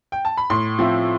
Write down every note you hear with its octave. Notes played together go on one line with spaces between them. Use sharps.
G5
A5
B5
A2 C6
F3 C4 E4